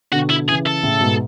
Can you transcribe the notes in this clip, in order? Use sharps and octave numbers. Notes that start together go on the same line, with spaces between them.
B2 D3 F#4
E4
C#3 E3 G#4
A4
A2 C#3
G#2 B2